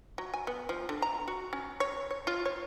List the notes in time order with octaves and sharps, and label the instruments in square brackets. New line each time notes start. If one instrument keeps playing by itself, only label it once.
[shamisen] F#3
G#5
B3
F3
D3
A#5
F#4
C#4
C#5
C#5
F4
C#5